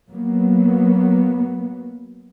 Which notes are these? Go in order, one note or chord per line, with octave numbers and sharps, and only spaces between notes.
F#3 A#3 B3